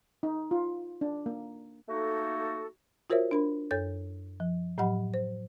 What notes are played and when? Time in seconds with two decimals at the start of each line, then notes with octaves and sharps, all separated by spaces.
0.23 D#4
0.51 F4
1.01 D4
1.26 A#3
1.88 A3 A#3 D#4 F#4 A4
3.10 F4 F#4 A#4 C5 C#5 E5
3.31 D4 A#4 B5
3.71 F#2 A4 C#5 G6 A6
4.40 F3
4.78 A2 F#3 G4 D#5 F#5 B5
5.14 C5